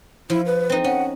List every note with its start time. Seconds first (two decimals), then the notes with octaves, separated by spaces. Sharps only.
0.30 F3 E4
0.46 B4
0.70 C4 D#4
0.84 C#4 F#5